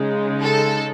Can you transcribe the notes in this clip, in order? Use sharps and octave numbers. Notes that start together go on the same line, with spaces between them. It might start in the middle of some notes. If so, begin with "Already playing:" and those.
Already playing: C#3 G#3 D#4
A4